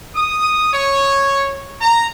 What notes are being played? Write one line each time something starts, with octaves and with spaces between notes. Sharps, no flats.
D#6
C#5
A#5